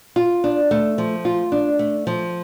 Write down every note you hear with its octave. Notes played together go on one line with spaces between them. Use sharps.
F4
D4
A3
F3
F4
D4
A3
F3